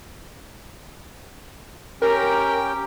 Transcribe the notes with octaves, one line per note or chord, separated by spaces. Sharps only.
C#4 G4 A#4 G5